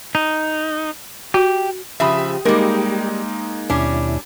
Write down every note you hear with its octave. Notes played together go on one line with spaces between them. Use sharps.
D#4
F#4 G4
C#3 F3 G4 E5 B5 D#6
G3 G#3 A#3 D#4 A#4
D#2 B2 G3 C#4 D4 E4